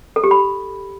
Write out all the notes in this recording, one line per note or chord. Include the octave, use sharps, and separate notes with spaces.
A4
G4
B5